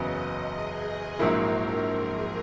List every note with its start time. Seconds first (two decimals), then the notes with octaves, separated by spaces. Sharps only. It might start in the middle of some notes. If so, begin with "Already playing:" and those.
Already playing: F#1 E2 C#3 F#3 B3 D#5
0.45 G#4
1.19 A#1 G#2 F#3 A#3 E4 A#4
1.94 G#4